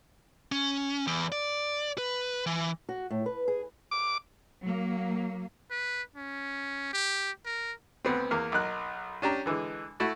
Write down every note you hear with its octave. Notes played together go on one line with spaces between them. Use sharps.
C#4
E2
D5
B4
E3
F#4
A2
B4
G#4
D6
F#3 A#3
B4
C#4
G4
A#4
D2 B3 C4
E2 A#3 A#4
B1 D#4 A#4 F#6
C#4 D4 G4 A#5
D3 E3 G#3
A3 E4 F#4 A4